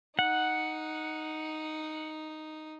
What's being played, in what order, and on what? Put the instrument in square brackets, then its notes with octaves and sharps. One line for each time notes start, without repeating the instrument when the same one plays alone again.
[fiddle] D#4 [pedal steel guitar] F#5